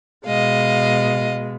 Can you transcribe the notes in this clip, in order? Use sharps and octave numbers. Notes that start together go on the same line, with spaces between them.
B2 G#3 D#5 F5